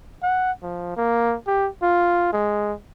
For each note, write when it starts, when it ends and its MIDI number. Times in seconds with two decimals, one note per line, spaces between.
0.23 0.52 78
0.63 0.93 53
0.97 1.35 58
1.47 1.69 67
1.83 2.30 65
2.33 2.74 56